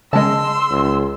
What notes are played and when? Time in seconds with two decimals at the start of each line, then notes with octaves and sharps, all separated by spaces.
0.13 C#3 G#3 D#5 A5 C6 E6
0.71 C#2